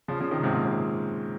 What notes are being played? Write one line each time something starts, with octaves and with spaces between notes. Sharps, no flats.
C#3 F3
C#3 F3
C3 D#3
G#2 C3
A#2
C3